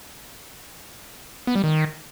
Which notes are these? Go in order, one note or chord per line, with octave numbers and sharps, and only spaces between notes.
B3
G3
D#3